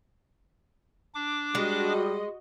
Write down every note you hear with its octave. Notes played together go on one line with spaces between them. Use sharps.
D4 D6
G3 G#3 F#4 D#5